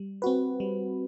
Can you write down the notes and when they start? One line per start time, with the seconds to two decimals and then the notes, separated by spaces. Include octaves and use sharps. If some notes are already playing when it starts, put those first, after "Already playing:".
Already playing: G3
0.22 C4 F#4 B4
0.60 G3